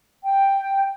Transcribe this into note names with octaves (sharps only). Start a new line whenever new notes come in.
G5